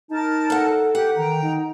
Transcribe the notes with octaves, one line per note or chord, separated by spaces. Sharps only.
D#4 A#4 A5
A4 F#5
G4 F#5
D#3 G5 A#5
D#4